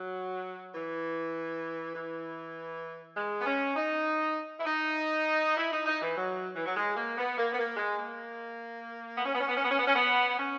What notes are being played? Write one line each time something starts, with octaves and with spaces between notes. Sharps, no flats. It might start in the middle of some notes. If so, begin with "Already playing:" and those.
Already playing: F#3
E3
E3
G#3
B3
C#4
D#4
E4
D#4
E4
D#4
D#4
E3
F#3
E3
F#3
G#3
A#3
B3
A#3
B3
A#3
G#3
A#3
B3
C#4
B3
C#4
B3
C#4
B3
C#4
B3
C#4
B3
C#4